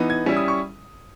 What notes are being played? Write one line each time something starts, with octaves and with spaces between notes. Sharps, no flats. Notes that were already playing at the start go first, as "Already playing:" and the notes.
Already playing: E3 B3 D#4
G#6
G3 C#4 E4
D#6
C#6